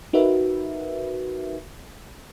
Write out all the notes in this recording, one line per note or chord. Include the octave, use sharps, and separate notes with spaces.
D#4 F#4 A#4 B4 E5